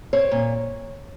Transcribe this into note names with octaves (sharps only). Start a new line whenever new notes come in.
C4 C#5
A#2